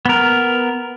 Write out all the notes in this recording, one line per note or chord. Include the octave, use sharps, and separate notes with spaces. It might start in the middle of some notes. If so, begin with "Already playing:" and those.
B3 A#4